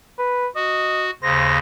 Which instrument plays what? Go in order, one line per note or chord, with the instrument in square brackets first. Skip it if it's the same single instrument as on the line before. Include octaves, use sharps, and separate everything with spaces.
[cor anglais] B4
[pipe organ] F#4 [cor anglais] D#5
[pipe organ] D#2 C#3 A#6 [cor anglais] C5